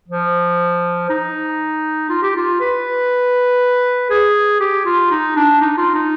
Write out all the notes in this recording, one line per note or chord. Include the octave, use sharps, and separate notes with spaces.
F3
D#4
F4
G4
F4
B4
G#4
G4
F4
D#4
D4
D#4
F4
D#4